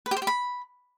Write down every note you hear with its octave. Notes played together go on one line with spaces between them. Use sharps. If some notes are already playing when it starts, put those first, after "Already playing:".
B4
G4
C5
G4
B5